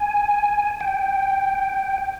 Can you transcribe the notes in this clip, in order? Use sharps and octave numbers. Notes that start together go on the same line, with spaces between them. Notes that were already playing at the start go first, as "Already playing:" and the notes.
Already playing: G#5
G5